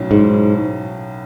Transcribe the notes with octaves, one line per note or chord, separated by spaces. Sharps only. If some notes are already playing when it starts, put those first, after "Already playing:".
Already playing: B1 A2 F#3 C#4
G#2